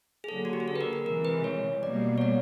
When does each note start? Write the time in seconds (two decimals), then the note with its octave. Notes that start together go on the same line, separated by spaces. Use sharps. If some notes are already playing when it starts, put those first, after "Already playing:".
0.24 G#4
0.29 D3 F#3 A#3 A4
0.45 F#4
0.53 G4
0.60 G#4
0.68 A4
0.76 B4
0.81 A#4
0.93 A#4
1.06 C3 E3 G#3 A#4
1.25 B4
1.44 C#5
1.83 B2 G3 A#3 D5
2.18 C#5
2.21 D5